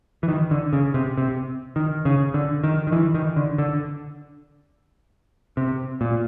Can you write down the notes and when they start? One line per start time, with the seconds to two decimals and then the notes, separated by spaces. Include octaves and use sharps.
0.23 E3
0.28 D#3
0.51 D3
0.73 C#3
0.94 C3
1.18 C3
1.76 D#3
2.05 C#3
2.34 D3
2.63 D#3
2.87 D#3
2.92 E3
3.15 D#3
3.36 D3
3.58 D3
5.57 C3
6.01 A#2